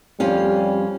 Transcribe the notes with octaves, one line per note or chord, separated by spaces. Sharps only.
F2 G3 C#4 F5